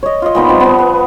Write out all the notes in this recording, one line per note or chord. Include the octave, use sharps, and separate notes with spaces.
C#5 D#5
F4 D#5
A#2 B3 D#4 B5
F3 G3 C4 D5
F3 B3
B4